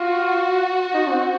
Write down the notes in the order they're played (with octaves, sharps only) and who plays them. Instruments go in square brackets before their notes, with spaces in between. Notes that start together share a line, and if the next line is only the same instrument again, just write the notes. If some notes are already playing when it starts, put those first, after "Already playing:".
Already playing: [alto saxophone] F4 [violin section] F#4
[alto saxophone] D#4
C#4
C4